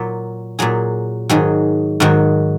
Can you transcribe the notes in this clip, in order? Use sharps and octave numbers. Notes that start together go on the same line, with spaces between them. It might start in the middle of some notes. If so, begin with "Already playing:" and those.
Already playing: A#2 F#3
A#2 F#3 G#4
G#2 D#3 F#3 G#4
G#2 D#3 F#3 F#4